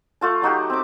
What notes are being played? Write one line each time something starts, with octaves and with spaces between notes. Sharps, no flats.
A3 F4 A5
F#3 D#4 F#4 G4
C4 D6